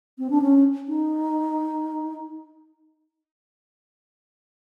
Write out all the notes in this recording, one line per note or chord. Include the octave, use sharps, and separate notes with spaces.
C4
D4
C#4
D#4